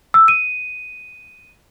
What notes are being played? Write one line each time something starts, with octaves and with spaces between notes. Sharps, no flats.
E6
D#7